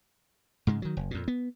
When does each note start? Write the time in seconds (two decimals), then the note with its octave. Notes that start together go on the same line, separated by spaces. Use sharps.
0.67 G#2 C#3 G#3
0.82 D#3 F#3
0.97 F#1
1.11 F2 A#2
1.28 B3